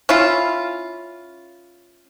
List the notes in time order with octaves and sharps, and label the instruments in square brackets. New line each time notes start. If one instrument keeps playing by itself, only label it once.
[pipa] C#4 E4 F4